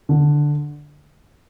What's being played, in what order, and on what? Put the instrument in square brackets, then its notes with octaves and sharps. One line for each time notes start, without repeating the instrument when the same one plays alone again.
[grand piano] D3